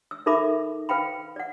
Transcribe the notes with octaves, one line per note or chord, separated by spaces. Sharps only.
E6
D#4 A4 A#4 E5 B5 D6
B4 F5 G5 B5
D5 F#5